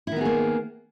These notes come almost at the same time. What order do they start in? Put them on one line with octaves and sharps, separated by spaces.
E4 D#3 B3 G#4 A#3